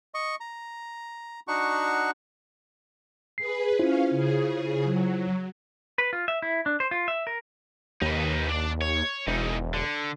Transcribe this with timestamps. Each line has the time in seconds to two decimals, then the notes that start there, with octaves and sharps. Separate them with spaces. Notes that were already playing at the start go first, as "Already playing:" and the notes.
0.14 D#5 C#6
0.40 A#5
1.48 D4 D#4 F#4 F#5 C#6
3.38 G#4 B4 C7
3.79 C#4 E4 F4 C5 F5
4.10 C#3 G#4
4.84 F#3
5.98 B4
6.13 F4
6.28 E5
6.42 E4
6.66 D4
6.80 C5
6.91 F4
7.08 E5
7.27 A#4
8.02 D#2 D#4 B4
8.49 D4 D5
8.82 C#5
9.27 E1 E3 D#4
9.74 D3